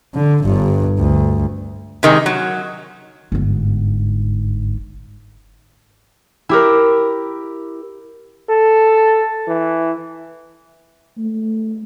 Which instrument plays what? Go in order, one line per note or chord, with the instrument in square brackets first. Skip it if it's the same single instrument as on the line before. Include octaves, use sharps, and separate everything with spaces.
[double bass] D3
G1 G2
D2
[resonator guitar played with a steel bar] C3 D#3 G#3
F#3
[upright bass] G1 G#2
[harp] E4 G4 A#4
[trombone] A4
E3
[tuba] A3